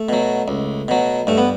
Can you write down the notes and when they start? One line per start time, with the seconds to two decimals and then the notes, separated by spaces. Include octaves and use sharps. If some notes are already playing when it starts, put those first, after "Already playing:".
Already playing: A3
0.09 B2 F#3
0.48 C#2
0.88 B2 F#3
1.27 G2 A3
1.38 B3